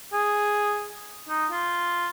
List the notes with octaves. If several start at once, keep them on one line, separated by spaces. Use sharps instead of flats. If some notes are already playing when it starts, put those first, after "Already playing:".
G#4
D#4
F4